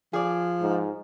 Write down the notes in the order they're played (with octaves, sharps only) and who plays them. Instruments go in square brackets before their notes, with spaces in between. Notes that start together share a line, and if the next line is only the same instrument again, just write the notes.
[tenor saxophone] F3 [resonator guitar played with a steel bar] G#4 D5
[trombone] G#2